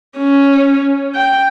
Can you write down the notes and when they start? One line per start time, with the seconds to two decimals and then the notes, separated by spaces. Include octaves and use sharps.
0.18 C#4
1.15 G5